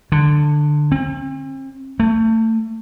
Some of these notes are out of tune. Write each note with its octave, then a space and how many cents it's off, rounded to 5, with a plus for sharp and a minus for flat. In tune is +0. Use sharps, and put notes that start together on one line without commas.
D3 +15
C4 +40
A3 +30